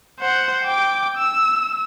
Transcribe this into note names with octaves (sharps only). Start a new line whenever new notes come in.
C5 F#5
G5 D6
E6